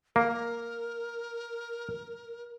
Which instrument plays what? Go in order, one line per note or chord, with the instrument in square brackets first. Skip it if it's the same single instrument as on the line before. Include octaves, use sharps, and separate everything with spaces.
[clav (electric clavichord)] A#3 [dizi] A#4